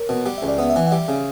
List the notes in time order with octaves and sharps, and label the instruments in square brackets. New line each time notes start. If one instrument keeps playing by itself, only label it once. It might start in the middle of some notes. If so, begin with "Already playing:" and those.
Already playing: [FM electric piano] A#4 C#5
[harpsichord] B2
[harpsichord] G3 [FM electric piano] F#5
[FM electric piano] E5
[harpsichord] C#2
[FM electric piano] D5
[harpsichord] B3 [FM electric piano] E5
[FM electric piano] E5
[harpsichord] E3 [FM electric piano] F#5
[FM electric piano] F#5
[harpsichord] G3 [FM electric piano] E5
[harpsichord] C#3